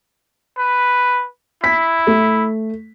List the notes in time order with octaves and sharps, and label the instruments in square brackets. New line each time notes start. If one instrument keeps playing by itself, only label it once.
[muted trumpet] B4
[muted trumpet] E4 [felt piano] B6
[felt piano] A3